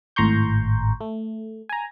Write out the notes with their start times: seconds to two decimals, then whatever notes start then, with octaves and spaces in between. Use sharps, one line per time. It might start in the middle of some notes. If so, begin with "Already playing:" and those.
0.16 G#1 A2 A#5 C6 C#6 G6
1.01 A3
1.69 G#5 A#5